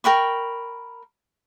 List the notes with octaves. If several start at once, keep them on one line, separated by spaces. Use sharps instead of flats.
A#4 G5 B5 C#6